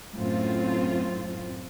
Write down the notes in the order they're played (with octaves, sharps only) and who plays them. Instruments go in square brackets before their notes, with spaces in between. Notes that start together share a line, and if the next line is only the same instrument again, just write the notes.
[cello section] F#2 A2 C4 F4